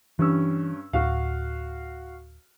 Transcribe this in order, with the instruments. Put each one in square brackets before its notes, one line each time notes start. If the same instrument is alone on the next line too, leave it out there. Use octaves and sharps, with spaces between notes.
[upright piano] G2 C#4 E6 [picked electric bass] E3
[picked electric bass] D1 [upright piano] F#4 F5